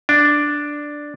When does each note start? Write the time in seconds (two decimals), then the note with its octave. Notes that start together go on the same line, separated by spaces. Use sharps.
0.09 D4